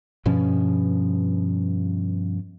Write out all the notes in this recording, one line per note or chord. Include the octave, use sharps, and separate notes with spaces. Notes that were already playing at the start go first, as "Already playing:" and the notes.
G2 B2 F3 C#4